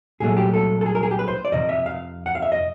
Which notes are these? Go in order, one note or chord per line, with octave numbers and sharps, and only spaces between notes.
C2 A#2 F#3 A3 G#4
G4
A4
A4
G#4
A#4
G#4
G4
B4
C5
D5
F2 C3 F3 D#5
E5
F5
F#5
F5
E5
D#5